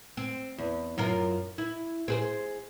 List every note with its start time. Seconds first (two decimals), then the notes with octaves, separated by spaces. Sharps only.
0.17 C4
0.58 E2
0.98 F#2 F4 A#4
1.58 E4
2.08 C4 G#4 C5